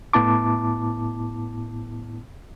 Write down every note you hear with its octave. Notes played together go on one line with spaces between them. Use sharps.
A2 B3 E4 A5 D6